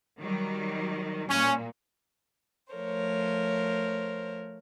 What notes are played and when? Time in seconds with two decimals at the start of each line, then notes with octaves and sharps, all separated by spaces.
0.18 D#3 F#3 G3
1.29 A#2 C#4
2.74 F3 A3 A#4 C5 C#5